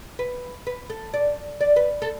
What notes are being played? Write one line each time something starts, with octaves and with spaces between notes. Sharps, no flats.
B4
B4
A4
D5
D5
B4
A4